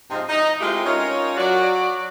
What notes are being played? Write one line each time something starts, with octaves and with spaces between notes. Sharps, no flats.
G#2 C3 F3 C4 D#4
D#4
G#3 A3 C4 E4 F4 G4
C#4 D#4 F4 A#4 C#5
F#3 F#4 D5